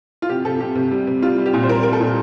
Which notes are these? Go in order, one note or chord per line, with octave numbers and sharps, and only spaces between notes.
F4
C3 G4
C3 A4
C3 G4
C3
G3
C3
G3 F4
G3
G4
A#2
C5
G3 A#4
G3 A#4
A4
A#2